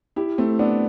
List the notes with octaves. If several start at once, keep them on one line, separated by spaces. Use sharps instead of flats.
E4 G4
A3 C4
B3 D4